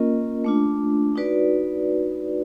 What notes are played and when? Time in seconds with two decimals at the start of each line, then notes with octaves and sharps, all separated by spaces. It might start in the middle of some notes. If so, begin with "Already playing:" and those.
Already playing: A#3 C#4 F4 A#4 D#5
0.44 A3 D4 F4
1.16 D#4 F#4 B4 D5